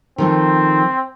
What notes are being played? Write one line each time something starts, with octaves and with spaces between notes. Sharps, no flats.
D#3 F3 A3 C4